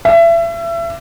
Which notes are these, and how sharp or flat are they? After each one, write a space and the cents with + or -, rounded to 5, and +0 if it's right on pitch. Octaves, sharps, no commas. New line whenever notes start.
E5 +30